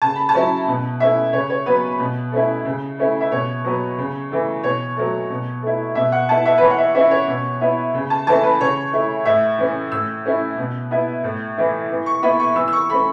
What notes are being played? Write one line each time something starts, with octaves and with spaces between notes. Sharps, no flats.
C#3 A5
B5
A5
F#3 C#4 E4
B2
A3 C#4 E4 E5
C#3 C#5
C#5
F#3 B3 B4
B2
A3 C#4 E4
C#3
A3 C#4 E4
E5
B2 C#5
F#3 B3
C#3
E3 A3
B2 C#5
F#3 A3
B2
A3 E4
B2 E5
F#5
B3 E4 A5
E5
B4
E3 C#5
F#5
E5
C#4 E4 E5
C#5
B2
B3 E4
C#3
A5
E3 A3 C#4 E4 A5
B4
C#3 C#5
A3 E4
A2 E5
E3 C#4
A2 E6
A3 C#4 E4
B2
B3 E4
A2
E3 A3 E4
E3
C#6
B3 E4 B5
C#6
E3 E6
E6
C#6
A3 C#4 B5